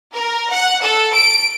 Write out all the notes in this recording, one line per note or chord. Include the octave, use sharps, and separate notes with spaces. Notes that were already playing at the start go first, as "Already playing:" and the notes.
A#4
F#5
A4
D7